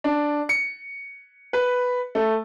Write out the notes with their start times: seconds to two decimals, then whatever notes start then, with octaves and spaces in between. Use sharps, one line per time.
0.04 D4
0.49 C#7
1.53 B4
2.15 A3